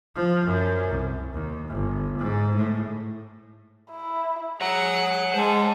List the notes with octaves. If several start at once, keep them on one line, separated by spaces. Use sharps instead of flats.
F3
F#2
C2
D#2
G1
G#2
A2
E4
G#4 C#5 F#5 A#5
G#3 C5 G#5 A5